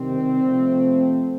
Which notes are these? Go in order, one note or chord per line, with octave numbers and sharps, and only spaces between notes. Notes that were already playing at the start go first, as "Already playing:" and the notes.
Already playing: C3 D#3 G3 C4
C3 F3 A3